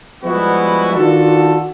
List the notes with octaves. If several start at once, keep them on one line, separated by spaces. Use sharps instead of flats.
F3 G3 G#3 B3 E4 F#4
D#3 D4 F4 F#4 A4